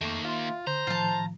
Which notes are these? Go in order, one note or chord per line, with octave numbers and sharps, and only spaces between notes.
F2 D#3 A3 A#3 C#6
F4 E5 F5 C6
D3 C5 A#5
A2 D#3 F3 F4 A5